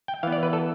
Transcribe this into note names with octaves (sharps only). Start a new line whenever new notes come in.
G5
E3 B3 F5
D5
B4
A4